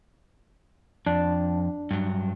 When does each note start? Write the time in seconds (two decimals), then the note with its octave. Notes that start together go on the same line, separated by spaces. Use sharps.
1.06 F2 D4
1.91 G2 F#3